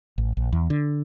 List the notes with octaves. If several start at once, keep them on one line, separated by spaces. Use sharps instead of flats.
A1
A#1
E2
D3